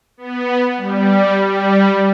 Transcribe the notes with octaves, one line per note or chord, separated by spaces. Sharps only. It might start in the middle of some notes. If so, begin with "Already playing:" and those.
B3
G3
G3